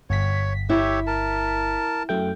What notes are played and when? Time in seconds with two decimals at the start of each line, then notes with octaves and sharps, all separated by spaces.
0.10 G1 C#5 B6
0.70 E4 G4 C#5 E5
1.07 A#4 A5
2.09 F#2 A3 G5